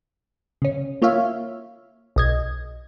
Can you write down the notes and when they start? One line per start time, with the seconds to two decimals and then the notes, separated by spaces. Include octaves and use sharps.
0.62 C#3 C#4
1.02 A#3 F4 C#5 E5 F5
2.16 B1 D#5 G#6